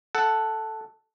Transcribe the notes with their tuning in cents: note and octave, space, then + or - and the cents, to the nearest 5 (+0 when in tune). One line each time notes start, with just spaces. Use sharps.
A4 +0 F#5 +5